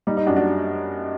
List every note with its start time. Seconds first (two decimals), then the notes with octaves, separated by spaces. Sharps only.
0.07 G3 D#4
0.17 D#4
0.26 F#2 D4 F#4
0.37 D4 F#4